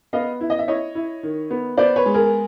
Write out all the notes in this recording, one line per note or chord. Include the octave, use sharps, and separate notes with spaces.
B3 D#5 F5
E4
D#5
E5
E4 C#5 D#5
E4
D#3
B3
B3 C5 D5
B4 C#5
G#3
G#4 A#4